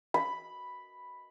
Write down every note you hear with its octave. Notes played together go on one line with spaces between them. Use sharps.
B5